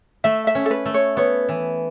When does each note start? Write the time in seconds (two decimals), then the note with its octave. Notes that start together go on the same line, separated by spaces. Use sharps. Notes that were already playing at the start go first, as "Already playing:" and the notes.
0.24 A3 E5
0.47 E5
0.55 C#4
0.65 A4
0.71 B4
0.86 A3
0.94 C#5
1.17 B3 C#5
1.49 E3